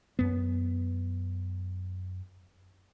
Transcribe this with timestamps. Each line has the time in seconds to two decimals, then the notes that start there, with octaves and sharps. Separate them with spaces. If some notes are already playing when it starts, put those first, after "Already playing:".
0.19 F#2 B3